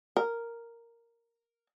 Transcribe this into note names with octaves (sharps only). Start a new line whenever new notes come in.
A#4